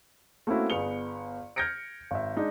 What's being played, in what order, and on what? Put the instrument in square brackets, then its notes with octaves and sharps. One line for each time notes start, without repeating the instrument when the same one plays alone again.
[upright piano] A3 A#3 C4 C#4 E4 F#4
G1 B3 G#4 C#7 F7 G7
F6 G6 G#6 A#6 C#7 D7
G#1 E5
G#3 D4 D#4